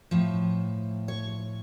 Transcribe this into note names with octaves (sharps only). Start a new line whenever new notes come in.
A2 F3
C#5